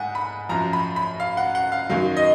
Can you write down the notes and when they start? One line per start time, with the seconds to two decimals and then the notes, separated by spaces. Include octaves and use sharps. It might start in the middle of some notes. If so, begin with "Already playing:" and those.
Already playing: G#2 F#5 G#5
0.15 B5
0.49 F#2 F3 A#5
0.73 B5
0.96 B5
1.20 F5
1.37 F#5
1.55 F#5
1.72 F5
1.89 F#2 D#3 F#3 F5
2.17 D#5